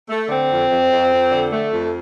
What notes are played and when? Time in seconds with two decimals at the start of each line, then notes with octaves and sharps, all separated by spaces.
0.08 A3
0.29 D3 C4
0.49 F2
0.69 F2
0.90 F2
1.11 F2
1.31 D3
1.52 A3
1.72 F2